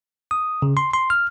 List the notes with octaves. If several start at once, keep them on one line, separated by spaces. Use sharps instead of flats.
D#6
C#3
C6
C6
F6